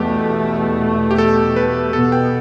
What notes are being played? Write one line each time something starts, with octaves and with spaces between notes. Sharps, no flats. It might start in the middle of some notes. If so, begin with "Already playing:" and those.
Already playing: E2 B2 A3 G4
G4
A4
B4
B2 B3 A4
G5